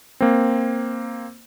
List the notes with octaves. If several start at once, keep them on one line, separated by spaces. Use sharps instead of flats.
A#3 C4